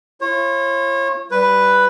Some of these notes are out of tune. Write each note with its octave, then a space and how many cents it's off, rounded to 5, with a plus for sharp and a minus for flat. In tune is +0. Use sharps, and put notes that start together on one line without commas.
F4 -45 C#5 -35
G3 -10 B4 +0